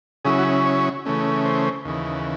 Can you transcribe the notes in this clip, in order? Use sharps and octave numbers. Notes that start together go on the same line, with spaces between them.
C#3 F#3 C#4 E4 G#4
F#4
C#5
C#3 E3 A3 C#4
C5
D#2 C#3 E3